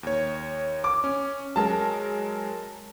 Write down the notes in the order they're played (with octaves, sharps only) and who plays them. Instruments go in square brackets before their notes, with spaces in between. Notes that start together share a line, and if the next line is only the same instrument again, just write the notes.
[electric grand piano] D#2 C#5
[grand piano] D6
[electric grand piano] C#4
[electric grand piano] F#3 G#3 A#4 [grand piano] A5